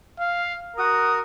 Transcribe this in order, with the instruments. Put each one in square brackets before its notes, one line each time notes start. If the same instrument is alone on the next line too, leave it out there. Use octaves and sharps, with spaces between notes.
[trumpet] F5
[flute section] F#4 D#6 [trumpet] A#4